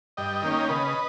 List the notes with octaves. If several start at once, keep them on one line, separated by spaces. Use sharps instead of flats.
G2 D#5 G5
D#3 A#3 C#4
C#3 B4 D#5